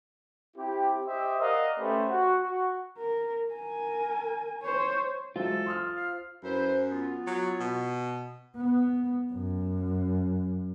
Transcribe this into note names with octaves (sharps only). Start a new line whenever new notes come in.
C4 E4 G4
G4 C5 D#5 E5
A#4 D5 D#5 F5 F#5
A3 C#4 G4 B4 C5
F#4
F#4
A#4
A#4 G#5
C5 C#5
E3 F#3 G#3 F4 A4 C5
C6 D#6 F6
F5
F#2 E4 B4 C5
B3 F4
F#3
B2
B3
F#2